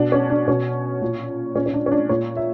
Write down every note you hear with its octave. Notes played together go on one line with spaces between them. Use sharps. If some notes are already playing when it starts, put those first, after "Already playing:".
Already playing: B2 D4
C#4
D4
B2 C#4
A#2
A#2 C#4
C#4
D4
C#4
D4
A#2 C#5
E5